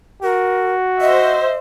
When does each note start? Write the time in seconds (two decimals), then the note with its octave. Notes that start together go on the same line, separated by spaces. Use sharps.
0.23 F#4 A#4
1.01 C5 D#5 E5